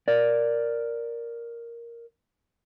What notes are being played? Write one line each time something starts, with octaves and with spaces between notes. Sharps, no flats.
A#4 D5